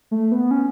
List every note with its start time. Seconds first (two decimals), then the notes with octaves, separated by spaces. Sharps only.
0.11 A3
0.32 B3
0.51 C#4